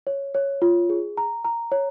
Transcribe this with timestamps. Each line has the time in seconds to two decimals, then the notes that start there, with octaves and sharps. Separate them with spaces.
0.07 C#5
0.34 C#5
0.62 F4
0.90 G#4
1.17 A#5
1.45 A#5
1.72 C#5